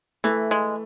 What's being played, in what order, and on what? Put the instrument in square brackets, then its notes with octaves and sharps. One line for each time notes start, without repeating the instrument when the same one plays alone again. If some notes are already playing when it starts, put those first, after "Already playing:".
[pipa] E3 [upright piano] A3
[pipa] G#3